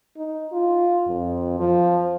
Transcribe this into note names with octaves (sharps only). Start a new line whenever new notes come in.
D#4
F4
F2
F3